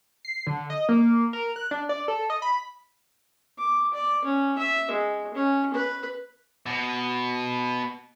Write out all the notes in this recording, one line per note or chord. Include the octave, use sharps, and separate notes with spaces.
C7
D3
D#5
A#3
A#4
F#6
D4
D5
A4
D#5
B5
D6
D5
C#4
E5
G#3
C#4
B4
B2